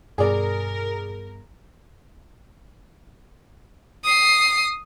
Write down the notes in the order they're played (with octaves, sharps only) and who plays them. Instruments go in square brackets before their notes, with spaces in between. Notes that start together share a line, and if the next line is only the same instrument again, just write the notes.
[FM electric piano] G2 B2 [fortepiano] G#4 D5 [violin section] A#4
[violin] D#6 C7